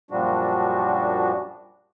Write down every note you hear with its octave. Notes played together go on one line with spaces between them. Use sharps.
F#2 A#2 F3 G3 D4 F#4